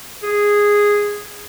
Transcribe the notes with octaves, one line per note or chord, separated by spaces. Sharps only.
G#4